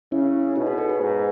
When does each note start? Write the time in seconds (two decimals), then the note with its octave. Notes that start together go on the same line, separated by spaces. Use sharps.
0.12 C#3 C#4 E4
0.56 B2 D#4 F#4
0.67 G#4 B4
0.78 A4 C#5
0.89 G#4 B4
1.00 G#2